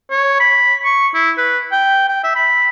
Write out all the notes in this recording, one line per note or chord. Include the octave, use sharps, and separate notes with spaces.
C#5
B5
C#6
E4
B4
G5
G5
E5
B5